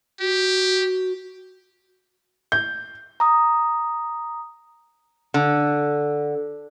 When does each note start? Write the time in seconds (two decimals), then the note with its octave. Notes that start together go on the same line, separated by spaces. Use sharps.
0.20 F#4 G4
2.52 G6
3.20 A#5 D#6
5.34 D3